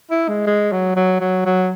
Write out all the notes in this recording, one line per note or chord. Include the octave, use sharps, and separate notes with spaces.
E4
G#3
G#3
F#3
F#3
F#3
F#3